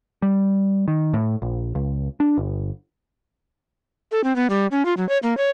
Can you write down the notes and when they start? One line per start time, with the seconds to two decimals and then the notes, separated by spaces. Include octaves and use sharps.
0.22 G3
0.88 D#3
1.14 A2
1.42 A#1
1.75 C#2
2.20 D4
2.38 G1
4.12 A4
4.24 C4
4.36 B3
4.50 G3
4.71 C#4
4.85 F4
4.97 F#3
5.09 C#5
5.23 A#3
5.37 C#5